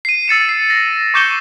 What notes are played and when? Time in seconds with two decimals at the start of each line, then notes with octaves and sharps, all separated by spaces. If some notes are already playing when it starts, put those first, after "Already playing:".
0.05 C7 D#7
0.28 E6 A6 C#7 E7
0.45 C7 D#7
0.70 A#6
1.14 C#6 D6 G6 C#7 E7 G7